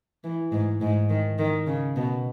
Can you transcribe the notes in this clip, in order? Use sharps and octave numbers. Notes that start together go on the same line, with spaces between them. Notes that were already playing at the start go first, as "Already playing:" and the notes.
E3
G#2
G#2
D#3
D#3
C#3
B2